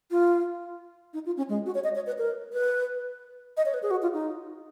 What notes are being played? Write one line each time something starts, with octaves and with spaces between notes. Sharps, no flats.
F4
D#4
F4
C#4
G#3
F#4
C#5
D#5
C#5
B4
A#4
B4
D#5
C#5
B4
G#4
F#4
F4
D#4